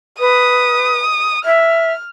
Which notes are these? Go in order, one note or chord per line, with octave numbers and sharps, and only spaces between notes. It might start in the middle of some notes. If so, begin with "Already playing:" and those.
B4 D#6
E5 F6